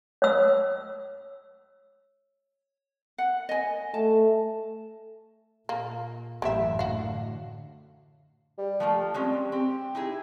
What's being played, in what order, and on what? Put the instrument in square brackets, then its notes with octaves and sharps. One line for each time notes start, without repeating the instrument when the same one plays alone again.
[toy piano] C#5 E6
[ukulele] F#5
D#5 G#5
[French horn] A3 [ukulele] A5
[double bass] A#2 [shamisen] A#3
[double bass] A1 F#2 [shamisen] A#3 G4 E5
[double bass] A2 D3 [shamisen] F#4 F5
[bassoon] G3
[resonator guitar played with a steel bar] F3 A3 A#3
[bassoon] G3 [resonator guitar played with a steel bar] G#3 C4 C#4
[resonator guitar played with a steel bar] C4 [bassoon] G4
[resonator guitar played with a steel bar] D#4 E4 G#4